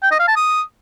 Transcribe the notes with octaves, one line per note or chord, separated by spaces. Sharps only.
G5
D#5
F5
A5
D#6